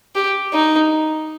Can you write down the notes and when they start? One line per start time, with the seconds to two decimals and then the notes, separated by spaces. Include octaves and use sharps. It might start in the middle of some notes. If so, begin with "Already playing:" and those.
0.15 G4
0.54 D#4